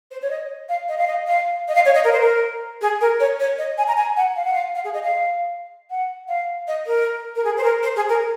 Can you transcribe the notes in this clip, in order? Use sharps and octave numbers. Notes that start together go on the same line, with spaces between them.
C5
C#5
D#5
F5
D#5
F5
D#5
F5
D#5
F5
C#5
D#5
A#4
C5
A#4
G#4
A#4
C#5
C#5
D#5
G#5
A#5
G#5
F#5
F5
F#5
F5
F5
G#4
D#5
F5
F#5
F5
D#5
A#4
A#4
G#4
C5
A#4
C5
G#4
A#4